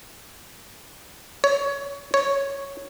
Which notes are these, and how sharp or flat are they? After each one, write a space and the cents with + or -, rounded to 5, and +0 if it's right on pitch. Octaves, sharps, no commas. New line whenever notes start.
C#5 +20
C#5 +0